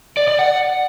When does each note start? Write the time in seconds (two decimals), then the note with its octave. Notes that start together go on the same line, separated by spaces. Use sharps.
0.17 D5
0.28 D5
0.39 F#5